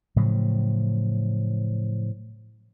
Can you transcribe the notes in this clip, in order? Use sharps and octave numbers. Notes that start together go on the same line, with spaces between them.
A2 C#3 F3 F#3